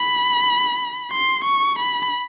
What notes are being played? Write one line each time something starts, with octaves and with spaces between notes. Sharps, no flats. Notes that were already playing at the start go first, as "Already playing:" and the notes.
Already playing: B5
C6
C#6
B5